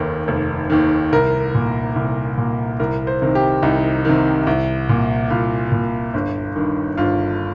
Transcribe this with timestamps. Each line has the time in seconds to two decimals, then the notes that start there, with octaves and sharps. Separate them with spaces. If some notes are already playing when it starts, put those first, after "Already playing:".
Already playing: F1 D#2 D#3
0.28 F1
0.70 D#2 D#3
1.12 C2 A#4
1.54 A#2
1.96 C2
2.38 A#2
2.80 C2 A#4
3.07 C5
3.22 C3 D#3
3.35 G4
3.62 C2 D#4
4.05 C3 D#3
4.47 C2
4.89 A#2
5.30 C2 F4
5.72 A#2
6.14 G1
6.56 G2 D#3
6.97 G1 F4